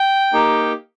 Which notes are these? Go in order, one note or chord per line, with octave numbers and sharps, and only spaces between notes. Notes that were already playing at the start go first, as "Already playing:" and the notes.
Already playing: G5
A#3 D#4 G4